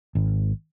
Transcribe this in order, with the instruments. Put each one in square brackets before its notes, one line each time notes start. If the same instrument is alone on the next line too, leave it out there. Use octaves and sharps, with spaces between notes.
[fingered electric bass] G#1